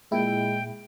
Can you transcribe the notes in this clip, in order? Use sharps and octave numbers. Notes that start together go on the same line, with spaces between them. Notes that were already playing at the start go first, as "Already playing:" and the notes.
A#2 G#3 E4 G5